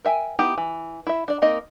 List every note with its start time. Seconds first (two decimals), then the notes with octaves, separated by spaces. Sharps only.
0.05 A#4 E5 G5 G#5
0.39 B3 D#4 E4 G4
0.58 E3
1.07 E4 E5
1.28 D4 D5
1.42 A#3 C4 D#4 A#4 D#5